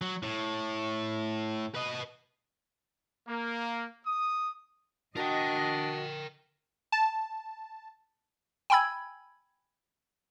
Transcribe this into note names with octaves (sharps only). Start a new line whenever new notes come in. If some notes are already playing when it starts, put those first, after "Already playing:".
F#3
A2
B4 D#5
A#3
D#6
D4 F#4 A#4 D#5 G5
A5
G5 G#5 B5 E6 G#6